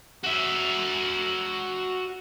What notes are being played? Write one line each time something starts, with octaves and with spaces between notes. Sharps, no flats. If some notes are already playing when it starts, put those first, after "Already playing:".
F#4 E5